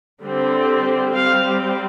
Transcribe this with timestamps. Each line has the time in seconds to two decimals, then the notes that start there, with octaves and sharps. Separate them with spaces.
0.21 D3 G3 C4
1.13 G3 C4 F5